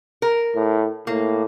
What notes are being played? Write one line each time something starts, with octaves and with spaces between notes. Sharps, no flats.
A#4
A2
A2 A#3